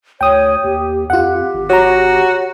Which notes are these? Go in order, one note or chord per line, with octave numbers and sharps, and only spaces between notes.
D2 C#5 G5 D#6
D#2 G4
F2 F4 G4 F#5
G#1
F#4 C#5 A#5